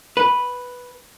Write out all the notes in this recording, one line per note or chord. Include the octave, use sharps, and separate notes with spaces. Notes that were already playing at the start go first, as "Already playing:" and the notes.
B4